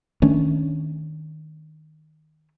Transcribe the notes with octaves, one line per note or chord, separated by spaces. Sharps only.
D#3 A3 C#4 D4